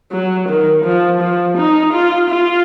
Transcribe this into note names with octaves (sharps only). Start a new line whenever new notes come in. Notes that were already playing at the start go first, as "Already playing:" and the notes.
F#3
D#3
F3
F3
D#4
F4
F4